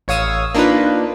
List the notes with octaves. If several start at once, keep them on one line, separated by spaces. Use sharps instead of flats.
A1 C#5 F5 D#6 E6
A#3 D4 D#4 F4 B4